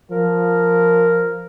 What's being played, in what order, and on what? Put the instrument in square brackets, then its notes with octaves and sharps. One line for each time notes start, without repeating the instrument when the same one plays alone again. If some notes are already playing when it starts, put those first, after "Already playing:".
[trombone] F3 [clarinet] A#4